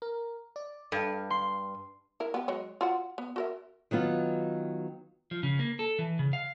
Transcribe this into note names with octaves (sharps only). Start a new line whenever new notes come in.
A#4
D5
G2 A4 F5
C6
E4 A#4
B3 G4
F#3 G#3 C#5
F4 F#4 F#5
B3
F#4 A#4 E5
D#3 F#3 B3 F4
F3
C#3
A#3
A4
E3
C#3
F5